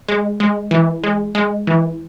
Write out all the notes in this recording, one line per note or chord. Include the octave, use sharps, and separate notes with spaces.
G#3
G#3
E3
G#3
G#3
E3